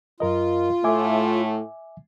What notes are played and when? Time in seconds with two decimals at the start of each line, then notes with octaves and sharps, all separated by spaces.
0.20 F#2 F4 A#4 D#5
0.84 A2 A3 E5 G#5 D6